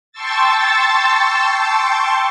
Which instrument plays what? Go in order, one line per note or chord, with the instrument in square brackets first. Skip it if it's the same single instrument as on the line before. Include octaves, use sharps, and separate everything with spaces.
[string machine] G5 A5 C6 C#6 E6 A6